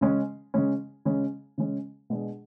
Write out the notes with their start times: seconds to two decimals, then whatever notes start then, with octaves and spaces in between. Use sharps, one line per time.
0.01 C#3 G#3 C#4
0.54 C#3 G#3 C#4
1.05 C#3 G#3 C#4
1.58 C#3 G#3 C#4
2.10 B2 G#3 D4 G#4